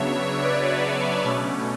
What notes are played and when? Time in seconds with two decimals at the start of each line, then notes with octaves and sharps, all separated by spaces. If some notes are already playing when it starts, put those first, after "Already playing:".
Already playing: C#3 F#3 B3 D4 C#5 E5
0.42 B4 D5
1.24 B2 A3 C#4